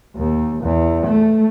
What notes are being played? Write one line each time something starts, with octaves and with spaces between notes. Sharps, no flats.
D#2
E2
A3